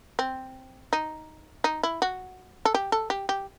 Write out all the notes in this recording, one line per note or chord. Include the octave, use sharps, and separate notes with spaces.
C4
D#4
D#4
E4
F#4
A4
G4
A4
G4
G4